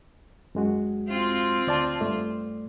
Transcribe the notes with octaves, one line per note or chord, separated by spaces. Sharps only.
F#2 G#3 F#4
C4 F4
D2 D5 A5
G2 A3 D5